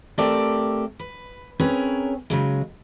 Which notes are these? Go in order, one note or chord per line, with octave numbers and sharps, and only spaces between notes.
A3 C4 G4 A4 A#4 D5
B4
C4 C#4 G#4 A#4 B4 C#5
C#3 F#3 G#3